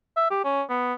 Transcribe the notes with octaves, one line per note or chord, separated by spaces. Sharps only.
E5
G4
C#4
B3